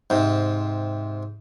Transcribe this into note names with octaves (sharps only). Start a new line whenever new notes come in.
G#2 C3